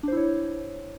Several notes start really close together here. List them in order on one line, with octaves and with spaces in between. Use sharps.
D4 C5 E4 C#5